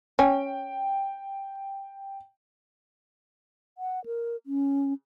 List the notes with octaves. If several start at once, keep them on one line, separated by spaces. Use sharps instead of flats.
C#4 G5
F#5
A#4
C#4